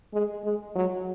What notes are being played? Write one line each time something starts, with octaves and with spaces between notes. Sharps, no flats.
G#3
G#3
F#3